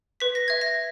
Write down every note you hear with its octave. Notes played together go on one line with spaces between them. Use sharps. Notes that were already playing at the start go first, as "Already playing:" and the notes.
B4 B6
A#6
E5 G#6
A#6